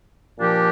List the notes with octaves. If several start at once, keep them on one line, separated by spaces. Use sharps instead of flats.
A#2 F3 D4 G4 A#4